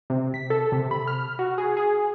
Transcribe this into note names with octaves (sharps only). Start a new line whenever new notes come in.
C3
B6
A4
C3
B5
F6
F#4
G#4
G#4